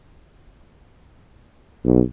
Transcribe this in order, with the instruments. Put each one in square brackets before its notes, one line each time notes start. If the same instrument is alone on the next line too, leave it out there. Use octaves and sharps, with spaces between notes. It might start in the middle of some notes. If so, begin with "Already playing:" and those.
[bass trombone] B1